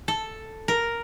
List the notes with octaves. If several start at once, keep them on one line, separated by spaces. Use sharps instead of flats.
A4
A#4